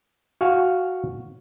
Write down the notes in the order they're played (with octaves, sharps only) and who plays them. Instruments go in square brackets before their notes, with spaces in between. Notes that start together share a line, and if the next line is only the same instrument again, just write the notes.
[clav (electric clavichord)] F#4 F5 G#5